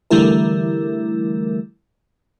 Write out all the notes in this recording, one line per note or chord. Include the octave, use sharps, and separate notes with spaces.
D3 E3 G3 A3 E4 A#4